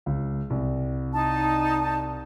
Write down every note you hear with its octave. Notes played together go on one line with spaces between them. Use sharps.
C#2
C2
D#4 A5